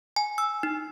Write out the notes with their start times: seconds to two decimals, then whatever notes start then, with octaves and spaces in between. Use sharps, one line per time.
0.16 G#5
0.38 E6
0.63 D#4